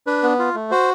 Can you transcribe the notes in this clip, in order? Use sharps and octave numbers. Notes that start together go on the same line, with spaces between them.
D4 B4
B3
F4
A3
F#4 C5